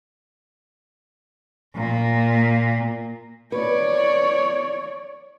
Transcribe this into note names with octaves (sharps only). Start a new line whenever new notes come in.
A#2 A#3
B4 C#5 D5